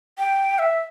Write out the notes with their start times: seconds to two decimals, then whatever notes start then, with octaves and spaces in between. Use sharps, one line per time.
0.18 G5
0.59 E5